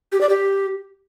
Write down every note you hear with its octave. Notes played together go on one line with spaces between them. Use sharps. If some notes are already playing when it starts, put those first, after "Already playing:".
G4
D5
G4